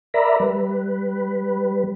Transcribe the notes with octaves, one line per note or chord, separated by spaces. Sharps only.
A#4 D5 E5 A#5 B5
G3 B4